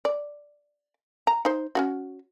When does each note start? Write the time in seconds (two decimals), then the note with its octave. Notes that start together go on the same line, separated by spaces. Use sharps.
0.05 D5
1.27 A#5
1.45 D#4 C5
1.75 C#4 D#4 F#4